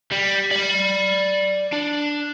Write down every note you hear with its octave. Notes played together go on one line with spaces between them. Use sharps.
G3
D5 B5
D4